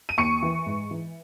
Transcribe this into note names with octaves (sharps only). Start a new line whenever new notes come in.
D#7
D#2 C#6 C#7
E3
G#2
E3